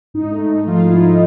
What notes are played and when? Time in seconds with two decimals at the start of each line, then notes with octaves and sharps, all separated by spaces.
0.14 G#2 D#4
0.32 A3
0.49 G#2
0.67 F3 F4
0.84 G#2 E4
1.02 A3 D#4